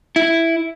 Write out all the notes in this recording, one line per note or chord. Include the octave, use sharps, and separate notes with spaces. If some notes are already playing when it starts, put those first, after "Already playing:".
E4